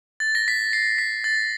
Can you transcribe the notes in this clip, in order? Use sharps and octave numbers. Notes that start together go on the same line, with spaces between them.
A6
A#6
B6
C7
B6
A6